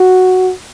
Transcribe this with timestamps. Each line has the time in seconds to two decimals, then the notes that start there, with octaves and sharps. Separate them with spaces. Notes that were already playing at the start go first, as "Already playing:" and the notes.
Already playing: F#4